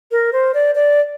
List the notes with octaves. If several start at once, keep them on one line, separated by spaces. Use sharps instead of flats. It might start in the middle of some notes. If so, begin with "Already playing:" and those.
A#4
C5
D5
D5